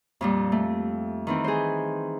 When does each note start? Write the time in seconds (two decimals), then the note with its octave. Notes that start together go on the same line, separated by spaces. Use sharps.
0.21 F2 A#2 G3
0.52 A3
1.27 D#3 E3 C4
1.44 G#4 C5